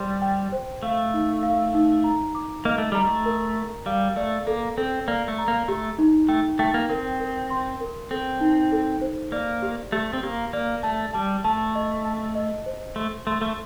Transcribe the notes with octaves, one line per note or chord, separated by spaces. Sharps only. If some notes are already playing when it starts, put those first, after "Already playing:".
Already playing: G3 C5 C6
G5
C5
A3 F5
D#4
F5
D#4
A#5
D6
A#3 D#5
A3
G3 A#5
A3
A#4
A#4
G3 F5
A3 D5
A#3 A4
C4 A4
A#3 D5
A3
A#5
A#3
A3 G4
D#4
A3 G5
A3 G5
A#3
C4 A#4
A#4
C6
A#4
C4 A4
D#4
A4
C5
A#3 D5
G4
A3 G4
C4
A#3 G4
A#3 D5
A3 A5
G3 A5
A3 A5
D#5
A5
D#5
C5
A3 C6
A3 C6
A3